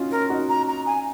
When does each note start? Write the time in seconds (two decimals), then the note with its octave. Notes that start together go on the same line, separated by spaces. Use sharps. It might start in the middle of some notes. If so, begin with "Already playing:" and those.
Already playing: C#4 D#4 F4 F#4
0.11 A#4
0.30 D#4 F#4
0.49 A#5
0.68 A#5
0.86 G#5